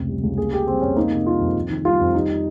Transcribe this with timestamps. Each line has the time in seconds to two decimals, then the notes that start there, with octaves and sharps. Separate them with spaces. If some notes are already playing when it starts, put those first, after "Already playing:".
Already playing: F1 C#2 C3
0.09 G3
0.23 C#2
0.38 A#3 G#4
0.52 C#3 G4
0.67 G3 C4
0.81 F2 C#4
0.96 A#3 D#4
1.12 C3
1.26 G3 F4
1.41 F2
1.56 F2
1.70 D#3
1.85 G3 F4
2.00 F2
2.14 G3 D#4